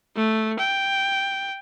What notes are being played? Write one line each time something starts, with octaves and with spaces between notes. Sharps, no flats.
A3
G5